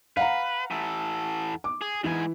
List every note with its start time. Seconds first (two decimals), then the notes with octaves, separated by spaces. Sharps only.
0.17 B4 F5 F#5 A#5
0.71 E3 A4
1.64 D6
1.81 G#4
2.04 G#2 E3 E4 G#5